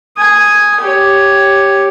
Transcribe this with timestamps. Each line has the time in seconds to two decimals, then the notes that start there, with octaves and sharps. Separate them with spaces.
0.18 G#5 D#6
0.80 G4 C#5